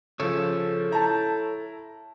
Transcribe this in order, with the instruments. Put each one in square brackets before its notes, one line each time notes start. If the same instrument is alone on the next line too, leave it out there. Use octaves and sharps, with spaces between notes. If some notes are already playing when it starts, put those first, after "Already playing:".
[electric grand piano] C#3 F3 [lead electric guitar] A4 C#5
[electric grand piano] E4 A#5 [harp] A5 G6